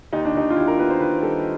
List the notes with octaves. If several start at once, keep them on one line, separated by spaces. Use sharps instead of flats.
D#2 D#4
D4
D#2 D#4
F4
D#2 E4
A#4
B3 B4
C5
D#3 B4
G3 A4